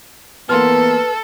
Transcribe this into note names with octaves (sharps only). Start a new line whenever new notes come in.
E3 A#3 B3 A4 B4 C6 F6